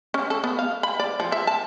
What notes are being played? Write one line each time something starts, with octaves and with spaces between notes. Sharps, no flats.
C#4
A4
B3
F5
B5
D5
F3
E5
A5